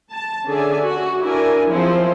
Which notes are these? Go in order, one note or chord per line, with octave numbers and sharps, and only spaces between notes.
A5
D3 C#4 G#4 D5 E5 G#5
F#4
D4 E4 A#4 G#5
F3 F#3 C4 E4 G#4 C5